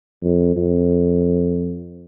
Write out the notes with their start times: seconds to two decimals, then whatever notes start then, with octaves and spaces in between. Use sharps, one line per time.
0.22 F2
0.56 F2